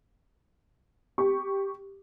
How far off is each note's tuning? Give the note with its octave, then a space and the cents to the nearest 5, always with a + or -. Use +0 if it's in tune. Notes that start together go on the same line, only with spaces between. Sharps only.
G4 +0 C#6 +0